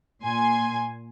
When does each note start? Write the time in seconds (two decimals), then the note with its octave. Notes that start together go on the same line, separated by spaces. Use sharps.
0.23 A#2 G#5 C6